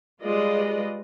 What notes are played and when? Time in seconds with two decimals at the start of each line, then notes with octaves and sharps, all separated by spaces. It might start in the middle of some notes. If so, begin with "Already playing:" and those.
0.23 G3 G#3 F4 B4 D5 D#5